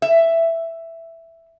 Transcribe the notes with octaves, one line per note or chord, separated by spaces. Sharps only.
E5